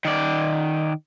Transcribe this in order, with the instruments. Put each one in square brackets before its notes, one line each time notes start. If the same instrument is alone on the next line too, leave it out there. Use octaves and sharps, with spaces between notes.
[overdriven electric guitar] D#3 D5